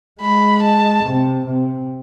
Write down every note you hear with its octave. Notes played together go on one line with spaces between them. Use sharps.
G#3 B5
A5
C3
C3